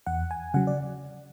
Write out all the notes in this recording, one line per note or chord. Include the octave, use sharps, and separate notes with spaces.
E2 F#5
G#5
C#3 F#3 F#5
D5